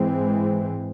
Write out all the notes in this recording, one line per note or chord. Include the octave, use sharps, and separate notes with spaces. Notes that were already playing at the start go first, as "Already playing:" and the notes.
Already playing: G#2 E3 G#3 C4